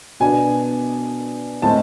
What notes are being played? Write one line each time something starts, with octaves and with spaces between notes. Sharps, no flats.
B2 B3 D4 G#5
A2 G#3 C4 A5